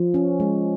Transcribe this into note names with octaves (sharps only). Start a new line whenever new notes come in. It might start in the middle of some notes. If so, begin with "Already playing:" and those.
Already playing: F3
C#4
G#3